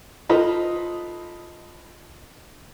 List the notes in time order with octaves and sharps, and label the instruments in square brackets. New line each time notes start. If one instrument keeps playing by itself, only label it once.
[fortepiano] D#4 F4 A4 B4 C5 D#5